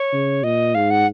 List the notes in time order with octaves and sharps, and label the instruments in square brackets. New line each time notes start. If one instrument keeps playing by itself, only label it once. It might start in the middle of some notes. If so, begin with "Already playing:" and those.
Already playing: [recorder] C#5
[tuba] C#3
[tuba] A#2 [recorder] D#5
[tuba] G#2 [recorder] F5
[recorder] F#5